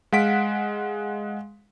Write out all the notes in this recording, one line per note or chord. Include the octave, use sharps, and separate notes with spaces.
G#3 F5 F#5 B6 D7